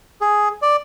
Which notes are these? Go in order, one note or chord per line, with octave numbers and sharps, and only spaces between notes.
G#4
D5